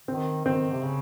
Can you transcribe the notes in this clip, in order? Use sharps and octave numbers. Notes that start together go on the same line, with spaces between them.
D#3 C4
D#3 C4
C3
C#3